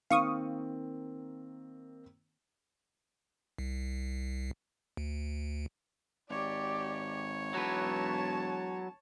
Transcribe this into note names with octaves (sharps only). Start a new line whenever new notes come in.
D#3 A#3 C4 F5 C#6 D#6
C2
D2
G#1 G4 C#5 D5
E1 F#3 B4 A5